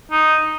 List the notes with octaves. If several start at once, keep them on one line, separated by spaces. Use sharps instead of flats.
D#4